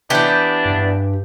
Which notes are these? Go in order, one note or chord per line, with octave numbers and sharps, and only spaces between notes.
E3 B3 D4 G4 G5
G2